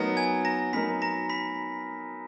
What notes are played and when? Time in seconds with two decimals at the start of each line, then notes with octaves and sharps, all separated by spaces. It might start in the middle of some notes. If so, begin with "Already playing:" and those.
Already playing: F#3 B3 D#4 A#4
0.17 G#5 G#6
0.45 A#5 A#6
0.73 F#3 B3 D#4 A#4 B5 B6
1.02 A#5 A#6
1.30 B5 B6